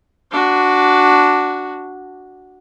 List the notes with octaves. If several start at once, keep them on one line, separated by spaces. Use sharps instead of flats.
D4 F#4